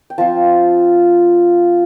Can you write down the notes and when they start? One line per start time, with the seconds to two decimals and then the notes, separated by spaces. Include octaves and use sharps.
0.10 G5
0.18 F3 C4 F4 A5